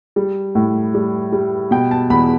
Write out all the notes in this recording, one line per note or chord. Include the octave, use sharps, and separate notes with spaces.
G3
A2
G3
G3
B2 G5
A5
E2 B5